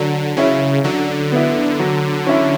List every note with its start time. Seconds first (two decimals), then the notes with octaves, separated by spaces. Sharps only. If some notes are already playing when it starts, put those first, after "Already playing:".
Already playing: D3 F#3
0.37 C#3 C#4 E4
0.84 D3 F#3
1.32 B3 E4
1.79 F#3
2.27 C#4 E4